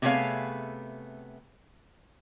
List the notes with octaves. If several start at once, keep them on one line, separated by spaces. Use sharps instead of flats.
C3 A3 B3 G#4 C#5 F5